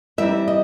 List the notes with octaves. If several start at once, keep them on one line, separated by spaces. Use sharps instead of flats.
E3 G3 C4 D#4 E5
D#5